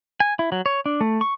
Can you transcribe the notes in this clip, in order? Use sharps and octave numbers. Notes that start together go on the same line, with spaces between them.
G#5
E4
F#3
C#5
D4
A3
C#6